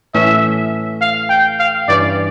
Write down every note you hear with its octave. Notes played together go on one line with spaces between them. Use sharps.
A2 E3 A3 C#4 E5
F5
G5
F5
G2 E3 G3 C#4 G4 D5